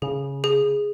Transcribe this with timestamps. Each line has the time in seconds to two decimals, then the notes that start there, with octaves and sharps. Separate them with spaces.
0.02 C#3 G#4
0.44 G#4